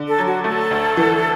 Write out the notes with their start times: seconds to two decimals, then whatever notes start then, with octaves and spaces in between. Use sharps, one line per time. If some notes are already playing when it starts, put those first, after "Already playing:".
Already playing: D3
0.09 A4
0.18 F#3
0.26 F#4
0.44 A3 A4
0.71 D2
0.97 E3